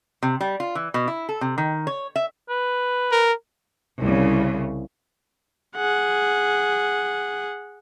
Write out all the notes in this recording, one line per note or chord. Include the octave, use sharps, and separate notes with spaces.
C3
G3
F4
E3
B2
E4
A4
C3
D#3
C#5
E5
B4
A#4
C2 C#3
G#4 F#5